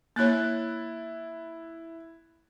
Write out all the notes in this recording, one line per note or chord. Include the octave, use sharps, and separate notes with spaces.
A#3 E4 C#5 F#6 A6